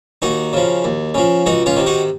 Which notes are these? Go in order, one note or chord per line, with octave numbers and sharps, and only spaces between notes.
D#2 D#4 F#4
C#3 F3
D#2
C#3 F3
C#2 D#4 F#4
C#4 F4
C3 D#3
D#4 F#4